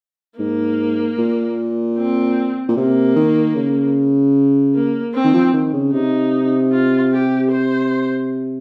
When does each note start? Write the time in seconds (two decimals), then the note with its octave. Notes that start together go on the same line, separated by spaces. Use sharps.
0.39 G#2 A#3
1.18 A#2
1.97 C4
2.69 A#2
2.77 C3 A#3
3.16 D#3
3.56 C#3
4.75 A#3
5.14 C4
5.24 D#3
5.34 F3
5.54 D#3
5.73 C#3
5.93 C3 D#4
6.72 F4
7.12 G4
7.51 C5